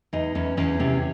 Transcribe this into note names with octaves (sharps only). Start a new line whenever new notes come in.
E2 D#4
E2 C#4
E2 C#4
C3 C#4